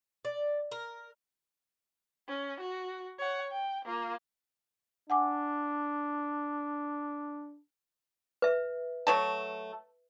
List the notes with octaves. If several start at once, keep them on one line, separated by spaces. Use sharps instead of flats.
D5
A#4
C#4
F#4
C#5 F#5
G5
A#3 F4
D4 F#5 G#5 D6
B4 E5
F#3 A3 A5